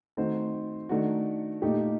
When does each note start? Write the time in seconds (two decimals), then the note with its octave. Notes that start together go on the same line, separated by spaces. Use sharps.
0.17 D#3 A3 C4 F#4 C5
0.89 D#3 A3 D4 F#4
1.62 A#2 A3 D#4 G4